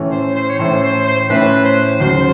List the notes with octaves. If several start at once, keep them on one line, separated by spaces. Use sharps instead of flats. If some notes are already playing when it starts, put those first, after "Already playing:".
Already playing: A2 E3 A3 C#4
C5
C5
C#5
A2 E3 A3 C#4 C5
C5
C5
C5
A2 E3 A3 C#4 B4
C5
D#2 C#3 F#3 C5